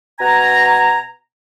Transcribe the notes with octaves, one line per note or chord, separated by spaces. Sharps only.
B2 F#5 G#5 A#5